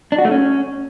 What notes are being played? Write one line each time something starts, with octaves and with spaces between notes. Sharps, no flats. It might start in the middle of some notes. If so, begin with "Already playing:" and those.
D4
F#4
A3
C#4